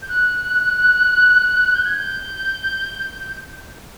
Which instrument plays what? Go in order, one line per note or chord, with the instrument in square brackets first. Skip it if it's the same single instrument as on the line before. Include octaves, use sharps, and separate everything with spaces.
[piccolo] G6
F#6
G6
G#6
G6